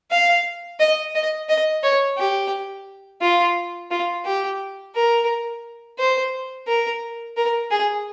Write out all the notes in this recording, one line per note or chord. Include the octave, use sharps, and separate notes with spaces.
F5
D#5
D#5
D#5
C#5
G4
F4
F4
G4
A#4
C5
A#4
A#4
G#4